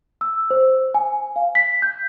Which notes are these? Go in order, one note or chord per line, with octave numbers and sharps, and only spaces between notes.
E6
C5
G#5
F5
B6
G6